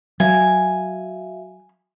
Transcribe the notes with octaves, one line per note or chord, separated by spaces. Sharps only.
F#3 F#4 E5 F5 G#5